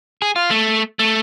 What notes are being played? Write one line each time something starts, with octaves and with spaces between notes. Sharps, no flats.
G#4
F4
A3
A3